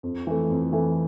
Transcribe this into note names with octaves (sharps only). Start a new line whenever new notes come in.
F2
E3 A3
F2
E3 A3